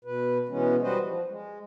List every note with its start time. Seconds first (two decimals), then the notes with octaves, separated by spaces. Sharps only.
0.05 B2 B4
0.49 B2 E3 G#3 B3 C#4
0.82 G3 F#4 B4 C5 D#5
1.01 F3
1.27 G#3